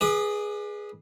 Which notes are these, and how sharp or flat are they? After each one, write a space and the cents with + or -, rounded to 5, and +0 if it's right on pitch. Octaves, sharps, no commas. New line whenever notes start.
G#4 +0 B4 -20 D5 +35